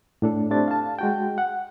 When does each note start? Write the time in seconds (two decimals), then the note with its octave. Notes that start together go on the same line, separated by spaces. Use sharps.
0.22 A2 D4 A4
0.51 A3 C4 D4 G4 A6
0.68 F5 A5
0.99 G#3 F#4 G5
1.38 F#5